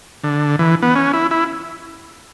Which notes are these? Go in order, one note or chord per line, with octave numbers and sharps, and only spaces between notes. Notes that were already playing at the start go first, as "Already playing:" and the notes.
D3
E3
B3
C#4
E4
E4